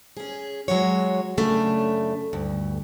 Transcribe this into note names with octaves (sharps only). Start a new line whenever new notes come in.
C#4 G#4
F#3 G#3 F#4 C#5
F#2 C#3 A3 D4
D2 G2